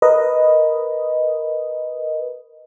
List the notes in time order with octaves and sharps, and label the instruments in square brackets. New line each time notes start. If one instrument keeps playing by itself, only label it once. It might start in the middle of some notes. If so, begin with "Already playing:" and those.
[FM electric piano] A#4 B4 D#5